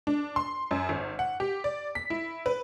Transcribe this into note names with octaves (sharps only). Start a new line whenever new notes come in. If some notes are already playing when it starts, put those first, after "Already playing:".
D4
C6
F#2
G#1
F#5
G4
D5
B6
E4
B4